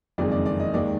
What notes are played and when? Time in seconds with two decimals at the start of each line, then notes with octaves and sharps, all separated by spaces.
0.18 F#1 F2 D#3 G#3 D5
0.32 D5
0.46 D5
0.60 D#5
0.74 D#2 D#3 G#3 D5